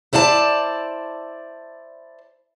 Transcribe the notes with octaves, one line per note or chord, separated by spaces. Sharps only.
E4 C5 D5 E5 A5